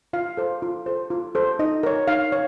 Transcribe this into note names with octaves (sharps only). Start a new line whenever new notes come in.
F4 F5
A4 C5
F4
A4 C5
F4
A4 C5
D#4 D#5
A#4 C#5
D#4 F5
C#5